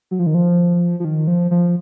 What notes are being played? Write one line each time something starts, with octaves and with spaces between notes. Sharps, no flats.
F#3
F3
D#3
F3
F3
D#3
F3
F3